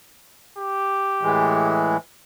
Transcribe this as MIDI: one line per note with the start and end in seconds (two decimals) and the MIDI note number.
0.58 1.76 67
1.22 1.97 45
1.22 1.97 52
1.22 1.97 56